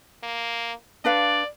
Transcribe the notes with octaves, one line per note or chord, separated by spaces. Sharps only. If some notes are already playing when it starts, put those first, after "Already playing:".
A#3
D4 B4 D5 F5